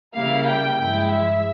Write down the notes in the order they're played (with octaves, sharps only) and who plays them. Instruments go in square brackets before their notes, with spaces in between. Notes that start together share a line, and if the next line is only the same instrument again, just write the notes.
[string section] C#3 G3 A#3 E4 F5
G5
G2 F3 G#3 E4 G5
E5